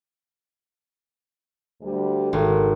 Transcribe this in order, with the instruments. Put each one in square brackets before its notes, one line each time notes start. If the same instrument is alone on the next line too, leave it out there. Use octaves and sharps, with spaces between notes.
[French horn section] D2 G3
[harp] G#1 [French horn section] F#4 A4